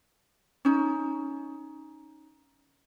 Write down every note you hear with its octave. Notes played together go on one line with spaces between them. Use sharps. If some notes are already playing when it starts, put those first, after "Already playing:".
C#4 D#4